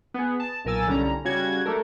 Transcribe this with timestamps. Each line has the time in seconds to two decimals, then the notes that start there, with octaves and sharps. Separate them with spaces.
0.14 B3 G#4
0.40 A5
0.65 B1 A#2 A#4 G#5 E6 A6
0.86 C2 D3 G3 C#4 A#5
1.25 C#3 G3 F#4 G#6
1.65 A3 D4 A4 A#4